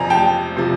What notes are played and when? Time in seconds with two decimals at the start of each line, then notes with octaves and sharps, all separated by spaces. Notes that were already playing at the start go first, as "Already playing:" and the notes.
Already playing: F2 C3 F3 G#5 A#5
0.10 G5 A5
0.57 C3 F3